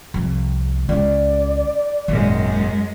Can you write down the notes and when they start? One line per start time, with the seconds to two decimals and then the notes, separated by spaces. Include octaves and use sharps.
0.14 C2 F2
0.89 C#2 C#3 D5
2.08 G#1 F#2 A#2 G#3